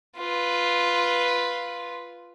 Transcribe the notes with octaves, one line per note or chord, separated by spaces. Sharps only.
F4 B4